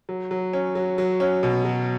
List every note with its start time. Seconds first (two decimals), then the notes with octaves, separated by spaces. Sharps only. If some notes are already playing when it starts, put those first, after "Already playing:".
0.09 F#3
0.31 F#3
0.53 C#4
0.75 F#3
0.98 F#3
1.20 C#4
1.43 B2
1.65 F#3